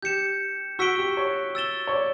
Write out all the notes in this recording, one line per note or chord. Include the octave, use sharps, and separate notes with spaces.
G4 G6 C#7 E7
F#4 C#6 E6 B6 D7 G7
G4
C#5
E6 A6 E7 G7
C#5
D5